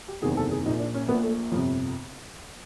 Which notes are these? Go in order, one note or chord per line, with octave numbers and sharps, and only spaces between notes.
G4
F#1 E2 C3 D#3 G#4
A4
G#4
A#1 A#2 D#4
D4
C#4
A#1 B3
A#2
A3
G1 F2 C3 F3